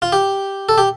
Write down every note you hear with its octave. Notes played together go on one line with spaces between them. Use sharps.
F4
G4
A4
G4